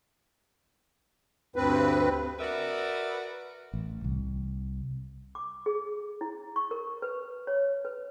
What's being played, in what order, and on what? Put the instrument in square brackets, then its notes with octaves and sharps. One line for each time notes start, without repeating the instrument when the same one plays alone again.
[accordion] D2 G2 C4 B4
[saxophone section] F#4 A#4 B4 D5 E5
[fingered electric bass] A1
C2
[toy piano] D6
G#4
E4
C#6
A#4
B4
C#5
B4